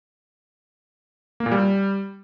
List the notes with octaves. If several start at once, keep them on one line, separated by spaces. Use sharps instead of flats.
A#3
A#2
G3